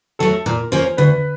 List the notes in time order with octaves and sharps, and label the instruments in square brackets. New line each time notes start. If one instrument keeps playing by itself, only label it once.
[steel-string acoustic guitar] F#3 A3 [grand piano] A4
[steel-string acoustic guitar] A#2 [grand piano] A#4
[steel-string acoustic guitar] F3 A#3 C#4 [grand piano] C5
[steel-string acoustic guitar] D2 [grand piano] B4